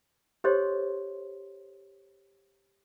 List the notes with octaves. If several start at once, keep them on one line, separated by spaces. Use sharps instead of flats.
G4 A4 C5 C#5 D#5 C6